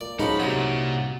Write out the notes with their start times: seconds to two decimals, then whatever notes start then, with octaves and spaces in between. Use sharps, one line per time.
0.01 A#2 D5
0.20 F3 F#3 C#4 D#4 G#4 A4 B5
0.40 C2 A#2 F#4 D#6